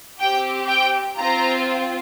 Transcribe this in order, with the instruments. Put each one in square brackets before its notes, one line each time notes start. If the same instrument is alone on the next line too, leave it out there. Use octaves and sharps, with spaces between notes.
[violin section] C4 G4 G5
G5
C4 F4 A#5